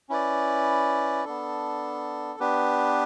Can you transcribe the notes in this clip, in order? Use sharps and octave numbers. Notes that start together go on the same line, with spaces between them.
C#4 E4 B4 D5
B3 D4 A4
B3 D4 G4 B4